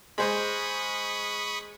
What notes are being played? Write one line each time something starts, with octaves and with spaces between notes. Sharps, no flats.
G#3 C5 B5 C#6 D#6